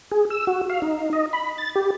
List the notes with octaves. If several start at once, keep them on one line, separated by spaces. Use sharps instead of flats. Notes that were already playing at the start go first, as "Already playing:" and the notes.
G#4
E6
F#4
F5
D#4
D#5
B5
A6
G4